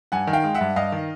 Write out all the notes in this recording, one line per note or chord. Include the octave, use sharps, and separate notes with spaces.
G2 F#5 G#5
D#3
F5 G5
G#3
E5 F#5
G2
G2 D#5 F5
D#3